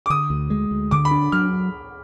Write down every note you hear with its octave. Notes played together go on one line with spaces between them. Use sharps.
D6
D3 D#6
D2
G#3
D2
D3 D6
B5
D4
F#3 F6